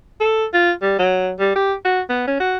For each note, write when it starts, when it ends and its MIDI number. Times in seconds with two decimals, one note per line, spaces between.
0.21 0.45 69
0.54 0.71 65
0.82 0.94 55
0.99 1.33 54
1.39 1.53 55
1.56 1.74 67
1.85 2.01 66
2.09 2.24 59
2.27 2.36 61
2.40 2.58 66